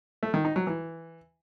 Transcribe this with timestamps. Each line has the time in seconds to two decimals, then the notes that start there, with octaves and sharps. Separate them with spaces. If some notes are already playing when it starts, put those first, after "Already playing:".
0.23 A3
0.34 D#3
0.45 D#4
0.56 F#3
0.67 E3